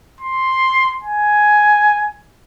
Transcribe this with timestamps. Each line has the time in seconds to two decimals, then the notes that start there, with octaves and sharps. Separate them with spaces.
0.21 C6
1.04 G#5